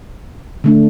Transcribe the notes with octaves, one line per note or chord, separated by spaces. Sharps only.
D3 A3 D4